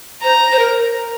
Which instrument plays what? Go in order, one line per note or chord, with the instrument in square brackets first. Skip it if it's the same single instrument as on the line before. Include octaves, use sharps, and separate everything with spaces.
[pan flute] C5 [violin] A#5
[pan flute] C5
A#4